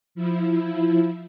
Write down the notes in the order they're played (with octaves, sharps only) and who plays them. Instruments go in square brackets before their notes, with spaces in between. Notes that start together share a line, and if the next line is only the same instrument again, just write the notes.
[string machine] F3 E4